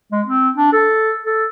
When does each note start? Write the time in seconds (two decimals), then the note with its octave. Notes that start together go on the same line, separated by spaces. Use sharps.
0.12 G#3
0.26 C4
0.55 D4
0.73 A4
1.25 A4